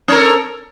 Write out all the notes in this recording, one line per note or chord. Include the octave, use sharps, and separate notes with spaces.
C4 A4 A#4